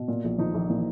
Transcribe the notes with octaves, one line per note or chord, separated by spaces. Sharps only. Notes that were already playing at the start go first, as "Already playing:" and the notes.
Already playing: B2
A#2
A#1
D#3 F3 D#4
A#1
A#2 E3 E4